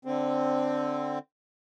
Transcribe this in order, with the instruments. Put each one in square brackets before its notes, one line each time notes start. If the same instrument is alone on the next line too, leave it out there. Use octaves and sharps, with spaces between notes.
[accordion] D3 C4